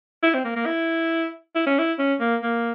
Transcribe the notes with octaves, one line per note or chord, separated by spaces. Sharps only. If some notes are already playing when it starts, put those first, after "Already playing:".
E4
C4
A#3
A#3
E4
E4
C#4
E4
C#4
A#3
A#3